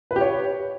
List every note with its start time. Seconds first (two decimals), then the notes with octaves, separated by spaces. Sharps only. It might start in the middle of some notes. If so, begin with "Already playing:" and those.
0.11 B4
0.16 G4
0.21 C#5